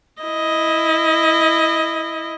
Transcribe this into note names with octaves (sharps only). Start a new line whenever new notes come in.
E4 D#5